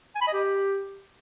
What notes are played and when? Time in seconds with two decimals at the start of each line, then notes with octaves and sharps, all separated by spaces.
0.15 G#5
0.21 B5
0.27 D#5
0.33 G4